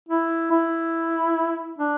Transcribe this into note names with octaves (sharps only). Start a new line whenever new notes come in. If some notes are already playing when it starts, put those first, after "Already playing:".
E4
E4
D4